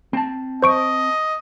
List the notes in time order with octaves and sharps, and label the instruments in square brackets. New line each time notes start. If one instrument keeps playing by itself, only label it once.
[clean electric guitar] C4 A5
[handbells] C5 C#6 D7 [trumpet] D#5